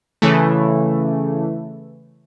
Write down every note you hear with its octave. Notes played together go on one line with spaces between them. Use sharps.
C#3 E3 A3